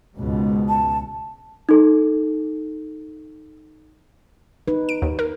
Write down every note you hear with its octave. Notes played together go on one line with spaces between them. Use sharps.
C#2 G#2 B2
A5
D#4 A4
D#4 B4
D7
D#2
A#4